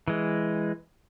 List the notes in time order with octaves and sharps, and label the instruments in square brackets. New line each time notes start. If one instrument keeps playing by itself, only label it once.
[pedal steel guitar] E3 G#3